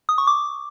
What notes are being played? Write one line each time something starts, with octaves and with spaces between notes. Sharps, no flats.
D#6
C#6
D6